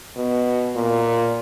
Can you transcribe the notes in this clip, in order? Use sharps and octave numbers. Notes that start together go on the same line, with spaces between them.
B2
A#2